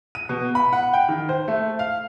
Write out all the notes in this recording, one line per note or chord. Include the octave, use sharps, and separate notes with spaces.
D#7
B2
B5
F#5
G5
D#3
C5
A3
F5